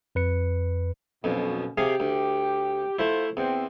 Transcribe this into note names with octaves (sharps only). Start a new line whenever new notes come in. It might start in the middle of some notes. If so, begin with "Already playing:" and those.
F2 B4 C#7
B1 F2 B2 A#3 C#4
C3 G4 G#4 F5
D2
A3 E4 F4 C5
E2 C4